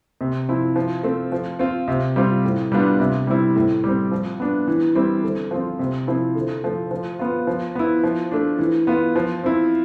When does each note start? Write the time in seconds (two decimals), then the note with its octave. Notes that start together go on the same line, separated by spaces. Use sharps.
0.21 C3
0.49 F3 C4 E4
0.76 F3
1.03 A3 C4
1.32 F3
1.59 C4 F4
1.88 C3
2.16 G3 C4 F4
2.44 A2
2.72 G3 B3 D4 F4
3.00 C3
3.27 G3 C4 E4
3.56 A2
3.84 G3 C4
4.12 F3
4.40 B3 D4
4.67 E3
4.95 G3 C4 E4
5.23 D3
5.51 F3 C4 F4
5.79 C3
6.07 F3 C4 E4
6.35 D3
6.64 F3 A3
6.91 F3
7.19 B3 F4
7.47 F3
7.75 B3 E4
8.04 F3
8.32 A3 D4
8.59 E3
8.87 B3 F4
9.16 F3
9.44 C4 E4